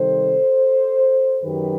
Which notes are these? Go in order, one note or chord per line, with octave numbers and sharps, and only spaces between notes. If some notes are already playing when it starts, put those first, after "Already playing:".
Already playing: C3 D#3 G3 A4 C5
F#2 D#3 F#3 G4 B4